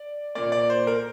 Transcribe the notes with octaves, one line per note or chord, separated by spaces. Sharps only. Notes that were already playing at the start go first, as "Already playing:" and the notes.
Already playing: D5
A#2 A#3 D5
D5
C5
A#4